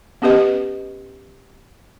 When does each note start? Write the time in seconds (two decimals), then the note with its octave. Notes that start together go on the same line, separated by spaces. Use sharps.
0.22 B3 C#4 G4 B4 D#5